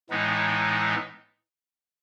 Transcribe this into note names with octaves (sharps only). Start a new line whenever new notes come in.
A2 E3 G#3 B3 D#4